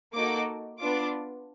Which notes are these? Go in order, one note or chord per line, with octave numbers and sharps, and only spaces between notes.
A#3 D#4 F#4 A4 D6
B3 D4 F4 D6